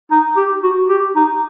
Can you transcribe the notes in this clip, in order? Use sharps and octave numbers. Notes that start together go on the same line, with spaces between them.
D#4
G4
F#4
G4
D#4